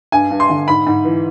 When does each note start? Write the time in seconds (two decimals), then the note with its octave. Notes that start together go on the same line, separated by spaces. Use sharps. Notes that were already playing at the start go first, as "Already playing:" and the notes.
0.12 G2 G#5
0.31 G2
0.40 C6
0.50 D3
0.67 G#2 B5
0.87 G#2
1.05 E3